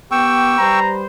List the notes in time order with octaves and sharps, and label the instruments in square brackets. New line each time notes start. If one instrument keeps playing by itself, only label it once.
[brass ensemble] B3 G4 [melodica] G5 C#6 E6
[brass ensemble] G3 B4 C5 [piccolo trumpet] A#5